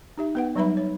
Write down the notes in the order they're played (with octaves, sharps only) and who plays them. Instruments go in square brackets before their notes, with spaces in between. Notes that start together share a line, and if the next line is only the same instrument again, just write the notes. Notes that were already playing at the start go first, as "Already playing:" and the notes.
[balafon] D#4 G4 E5
B3 B4 F#5
F#3 G3 D#4 B4 E5 B5
C#5